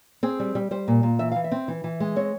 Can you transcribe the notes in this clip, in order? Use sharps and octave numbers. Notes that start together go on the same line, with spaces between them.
C4 G#4
G3
G3
G3 C5
A#2
A#2
E3 E5
E3 F5
E5
C4
E3
E3
G#3
C4 C#5